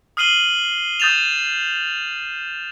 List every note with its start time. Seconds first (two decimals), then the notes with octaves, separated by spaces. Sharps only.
0.17 D#6 F6 C7 D#7 F#7 G7
1.00 D#6 G6 A6 E7 F7